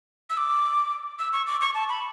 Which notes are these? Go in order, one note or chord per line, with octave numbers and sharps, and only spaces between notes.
E6
D6
E6
C#6
D6
C#6
A5
B5